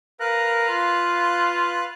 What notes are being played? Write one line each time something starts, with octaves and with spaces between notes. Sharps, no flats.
A#4 B4 F5 F#6
F4